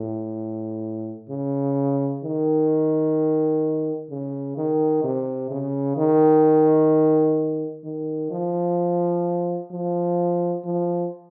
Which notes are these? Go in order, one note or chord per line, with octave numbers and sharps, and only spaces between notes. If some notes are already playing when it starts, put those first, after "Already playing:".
Already playing: A2
C#3
D#3
C#3
D#3
C3
C#3
D#3
D#3
F3
F3
F3